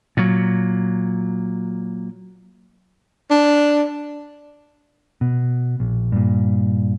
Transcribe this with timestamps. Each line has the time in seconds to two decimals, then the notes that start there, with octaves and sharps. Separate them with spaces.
0.17 A#2 F#3
3.30 D4
5.21 B2
5.80 A#1
6.12 G2 A#2